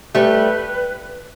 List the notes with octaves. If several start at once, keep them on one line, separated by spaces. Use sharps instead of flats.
G3 A3 B4 C5